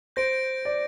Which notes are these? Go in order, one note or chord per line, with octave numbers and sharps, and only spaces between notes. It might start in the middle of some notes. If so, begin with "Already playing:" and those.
C5 G6 A#6 D7
D5